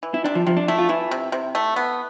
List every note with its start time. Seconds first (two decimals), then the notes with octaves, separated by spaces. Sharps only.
0.03 E3
0.14 E4
0.24 C3 D4
0.35 F3
0.47 C3 F3
0.57 D4
0.68 A3 E4
0.79 F4
0.89 E3 E4
1.11 C3
1.32 C3
1.55 A3
1.76 B3